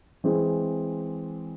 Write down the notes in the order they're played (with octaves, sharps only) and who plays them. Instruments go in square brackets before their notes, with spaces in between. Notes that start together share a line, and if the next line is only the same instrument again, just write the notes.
[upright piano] E3 G#3 C4